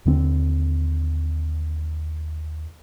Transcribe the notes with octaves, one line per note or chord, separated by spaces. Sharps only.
D#2 D3 B3 C4